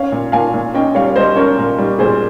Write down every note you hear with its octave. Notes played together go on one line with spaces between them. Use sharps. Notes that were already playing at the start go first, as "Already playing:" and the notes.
Already playing: C#4 C#5 F5
A#2
A#2 F5 G#5
A#2
C#4 D#5 G5
G3 C#5 F5
G3 C5 D#5
C#4 A#4 C#5
A#2 A#4
G3
A#2 G#4 C5